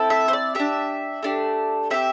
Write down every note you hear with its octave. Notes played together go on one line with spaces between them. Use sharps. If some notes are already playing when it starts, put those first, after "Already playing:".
Already playing: C4 E4 A4
E5
C5
D5
D4 G4 E5
A3 D4 G4
C4 G4 E5